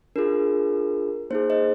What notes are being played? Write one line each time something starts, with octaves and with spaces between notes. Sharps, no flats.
D4 F4 G#4 A#4
A#3 D#4 G#4 C5
C5 D#5